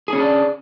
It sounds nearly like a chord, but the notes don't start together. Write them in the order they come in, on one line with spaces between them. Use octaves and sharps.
G#4 C#4 D4